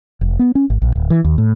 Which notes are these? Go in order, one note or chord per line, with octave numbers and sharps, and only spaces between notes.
F1
B3
C#4
G#1
A#1
D1
E3
D#2
A2